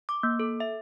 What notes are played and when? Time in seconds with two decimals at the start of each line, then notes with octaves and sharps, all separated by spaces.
0.09 D6
0.23 A#3
0.40 A4
0.60 E5